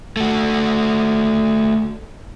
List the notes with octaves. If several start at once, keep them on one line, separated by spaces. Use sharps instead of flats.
A3 F#4